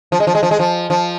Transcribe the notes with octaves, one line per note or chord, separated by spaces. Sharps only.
F3
G#3
F3
G#3
F3
G#3
F3
F3